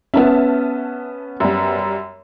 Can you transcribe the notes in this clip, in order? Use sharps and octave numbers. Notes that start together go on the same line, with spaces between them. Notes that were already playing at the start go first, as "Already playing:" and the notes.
B3 C#4 E5 A5 F6
F#2 G3